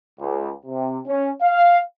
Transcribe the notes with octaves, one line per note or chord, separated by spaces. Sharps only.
C#2
C3
C#4
F5